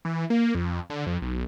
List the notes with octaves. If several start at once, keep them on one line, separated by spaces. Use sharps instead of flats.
E3
A#3
F2
D3
F2
B1